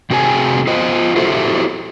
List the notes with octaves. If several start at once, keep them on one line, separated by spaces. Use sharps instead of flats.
C3 C4 F#4 G#4 A#4 G#5
F4 C5 D#5
E4 F#4 G4 A4 C5 E5